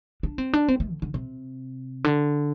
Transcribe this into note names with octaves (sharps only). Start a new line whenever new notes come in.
D4
C4
D4
C4
A3
D3
D3
C3
D3